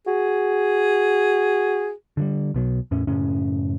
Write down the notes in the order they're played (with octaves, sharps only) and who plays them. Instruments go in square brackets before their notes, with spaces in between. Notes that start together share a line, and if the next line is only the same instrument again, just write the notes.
[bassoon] F#4 [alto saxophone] G#4
[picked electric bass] D3 F3 G3
B1 B2 F#3
E2 A2 C#4
F#2 A2 C#3 C#4